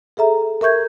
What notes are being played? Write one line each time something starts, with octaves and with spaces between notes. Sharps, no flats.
G#4 A4 E5 A#5
A#4 E5 C#6 G6 G#6